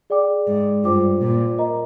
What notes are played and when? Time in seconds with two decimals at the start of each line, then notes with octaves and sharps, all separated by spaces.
0.10 G#4 D5 G5 D6
0.47 G#2
0.84 G2 F4 C5 G5 D6
1.21 A#2
1.58 A#4 D#5 A#5